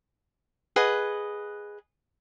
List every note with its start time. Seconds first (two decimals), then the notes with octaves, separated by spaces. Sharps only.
0.76 G#4 B4 D#5 F#5